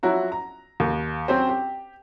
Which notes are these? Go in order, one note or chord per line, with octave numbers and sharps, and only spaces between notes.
F3 F#3 E4 F#4 A#5
A#5
D#2
F#3 C4 C#4 G4 C5
G4